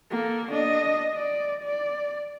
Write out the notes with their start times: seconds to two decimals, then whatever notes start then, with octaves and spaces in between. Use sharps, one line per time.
0.11 A#3 A4
0.51 D4 D#5
1.14 D5
1.63 D5